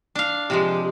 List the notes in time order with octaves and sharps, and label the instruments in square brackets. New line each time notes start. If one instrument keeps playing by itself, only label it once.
[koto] D4 F5
[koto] C3 F3 G#3 [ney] G4